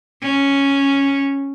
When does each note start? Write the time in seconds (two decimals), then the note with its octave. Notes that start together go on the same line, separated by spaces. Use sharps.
0.22 C#4